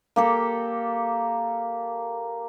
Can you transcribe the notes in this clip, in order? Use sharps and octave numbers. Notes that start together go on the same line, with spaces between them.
A#3 G4 A4